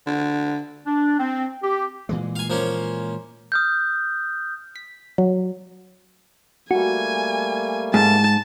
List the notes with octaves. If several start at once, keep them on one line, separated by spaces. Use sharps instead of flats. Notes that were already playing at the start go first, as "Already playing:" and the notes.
D3
D4
C4
G4
A#2 E3 G#3
F5 G#5
F3 A#3 C#4
D#6 F6 G6
B6
F#3
G3 A3 A#3 F#4 G#5
G#2 A5